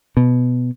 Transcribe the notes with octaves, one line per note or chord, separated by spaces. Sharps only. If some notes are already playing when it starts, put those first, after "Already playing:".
B2